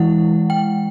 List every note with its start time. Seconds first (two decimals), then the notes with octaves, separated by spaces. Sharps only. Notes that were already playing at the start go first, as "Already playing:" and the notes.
Already playing: E3 G#3 E4 F#5
0.50 G5